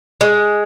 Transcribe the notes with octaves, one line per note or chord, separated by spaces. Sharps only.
G#3